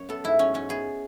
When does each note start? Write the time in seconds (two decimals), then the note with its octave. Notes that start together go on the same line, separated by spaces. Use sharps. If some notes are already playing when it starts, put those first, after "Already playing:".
Already playing: F#2 C#5
0.09 B3 A4
0.24 G#2 E4
0.39 F#3 C#4
0.54 G#2 C#4
0.69 B3 G#4